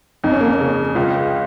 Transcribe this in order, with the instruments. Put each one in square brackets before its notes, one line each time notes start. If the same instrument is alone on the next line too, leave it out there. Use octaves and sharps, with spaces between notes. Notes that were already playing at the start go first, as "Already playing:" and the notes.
[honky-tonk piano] F2 [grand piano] D#4
[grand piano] C#4
A#3
C#4
[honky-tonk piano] C#3
[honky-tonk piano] C#2 [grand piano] F4